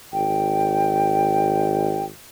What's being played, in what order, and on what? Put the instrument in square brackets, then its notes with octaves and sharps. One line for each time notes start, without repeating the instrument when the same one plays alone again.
[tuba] G#1 [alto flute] G5